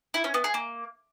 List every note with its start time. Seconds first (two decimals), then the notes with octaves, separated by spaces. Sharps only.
0.14 E4
0.24 C#4
0.34 B3
0.44 G#4
0.54 A#3